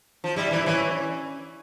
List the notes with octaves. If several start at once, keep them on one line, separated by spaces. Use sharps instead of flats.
F3
G3 E4
E3 E4
E3 C#4